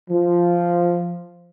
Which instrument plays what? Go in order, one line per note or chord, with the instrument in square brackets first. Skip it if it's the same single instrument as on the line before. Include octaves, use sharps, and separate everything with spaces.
[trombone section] F3